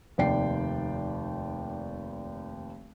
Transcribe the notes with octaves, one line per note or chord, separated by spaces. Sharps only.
F1 D#2 D5 G5 C7